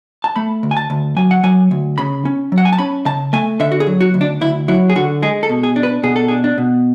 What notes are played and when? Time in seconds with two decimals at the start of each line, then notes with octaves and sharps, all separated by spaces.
0.24 A5
0.36 A3 B5
0.63 D2
0.71 G#5
0.77 A5
0.90 D2
1.16 F#3 G#5
1.31 F#5
1.43 F#3 G#5
1.71 D2
1.98 C#3 B5
2.25 C#4
2.52 F#3
2.58 F#5
2.65 G#5
2.73 A5
2.78 C#4 B5
3.06 C#3 A5
3.33 A3 G#5
3.60 D3 E5
3.72 F#4
3.80 G#4
3.87 F#3
4.01 F#4
4.14 D2
4.21 D4
4.41 D2 E4
4.68 F#3 E4
4.89 G#4
4.95 D3 F#4
5.22 G#3 G#4
5.43 A4
5.50 B2
5.63 G#4
5.76 D4
5.83 B4
6.03 B2 G#4
6.16 A4
6.28 G#4
6.31 D4
6.44 D4
6.58 B2